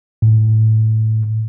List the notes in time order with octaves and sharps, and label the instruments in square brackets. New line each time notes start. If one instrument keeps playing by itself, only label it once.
[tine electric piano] A2